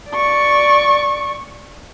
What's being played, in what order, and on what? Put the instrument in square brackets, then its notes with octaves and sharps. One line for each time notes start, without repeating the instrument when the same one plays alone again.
[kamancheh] D5 C#6